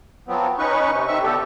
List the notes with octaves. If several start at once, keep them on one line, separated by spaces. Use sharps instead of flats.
F3 F#3 B3 C4
C#4 D#4 B4 C#6
C3
D#3 C4 E5 C#6
B2 D3 G4 A4